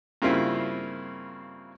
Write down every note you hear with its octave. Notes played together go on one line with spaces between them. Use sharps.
G2 C#3 A#3 C4 E4 F4